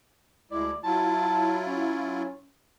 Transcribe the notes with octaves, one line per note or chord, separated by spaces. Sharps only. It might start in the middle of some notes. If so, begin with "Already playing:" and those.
D2 G#3 E4 D5
F#3 E4 F4 A5
C#4